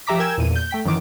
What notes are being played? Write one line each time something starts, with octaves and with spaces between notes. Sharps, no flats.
F3 G4 E5 A#5 D6 B6
A#4 G5 G#5 E6 G#6 E7
E2 A#2 D#7
G6
A3 G5 B6
F#2 D#3 E3 D6